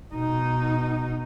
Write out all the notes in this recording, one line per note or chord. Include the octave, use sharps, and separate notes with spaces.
B2 D#4